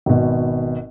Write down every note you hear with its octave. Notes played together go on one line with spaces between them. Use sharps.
G#1 B2